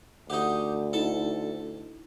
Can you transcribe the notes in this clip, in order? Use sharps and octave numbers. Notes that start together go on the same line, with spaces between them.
D2 D#4 G4 F#5 D#6 G6
D#4 E4 A4